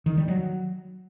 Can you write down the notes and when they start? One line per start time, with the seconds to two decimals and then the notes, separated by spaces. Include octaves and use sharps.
0.06 D#3
0.17 G3
0.28 F#3